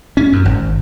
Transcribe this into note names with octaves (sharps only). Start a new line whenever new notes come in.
C#4
F#2
G#1